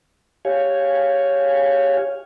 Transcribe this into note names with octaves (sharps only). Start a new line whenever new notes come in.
G4 C#5 F5 G#5